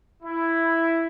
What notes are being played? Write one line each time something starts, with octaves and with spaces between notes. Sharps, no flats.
E4